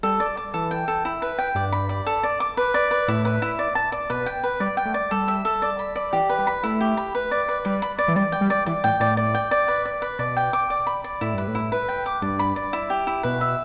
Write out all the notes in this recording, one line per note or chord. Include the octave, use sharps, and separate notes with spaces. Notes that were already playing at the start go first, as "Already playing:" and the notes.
G3 A4
D5
D6
E3 A4
G5
A4
E4
B4
G5
G2 D5
B5
D5
A4
D5
D6
B4
D5
B4
A2 E4
B4
E4
D5
A5
D5
B2 B4
G5
B4
G3 D5
G5
A3
D5
G3 A4
E5
A4
D5
B5
D5
E3 G4
B4
G3
B5
A3 E4
G4
B5
B4
D5
B4
G3 D5
B5
D5
E3
G3 D5
G5
G3
D5
E3 D5
A2 G5
A2 D5
D5
G5
D5
B4
D5
B4
B2 D5
G5
D6
D5
B5
D5
A2 E4
G2 B4
A2
E4
B4
G5
D6
G2 D5
B5
D5
E4
G4
E4
B2 B4
E5